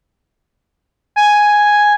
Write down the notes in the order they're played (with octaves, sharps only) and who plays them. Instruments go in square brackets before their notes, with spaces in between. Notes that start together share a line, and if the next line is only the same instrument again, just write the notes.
[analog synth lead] G#5